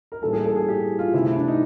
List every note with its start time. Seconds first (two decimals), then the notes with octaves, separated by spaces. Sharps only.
0.12 A#4
0.22 A2 E3 G3 A#3 A4
0.33 G#4
0.46 A4
0.56 G#4
0.69 G4
0.99 F4
1.13 C3 E3 A3 E4
1.25 E4
1.36 D4
1.48 D#4